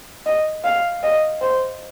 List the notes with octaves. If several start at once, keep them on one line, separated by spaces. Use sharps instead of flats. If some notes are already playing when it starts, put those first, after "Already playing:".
D#5
F5
D#5
C5